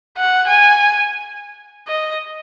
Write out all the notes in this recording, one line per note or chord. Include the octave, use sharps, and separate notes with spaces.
F#5
G#5
D#5